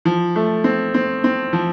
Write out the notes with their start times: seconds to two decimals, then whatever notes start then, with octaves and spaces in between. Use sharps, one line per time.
0.05 F3
0.36 A3
0.64 C4
0.94 C4
1.24 C4
1.53 F3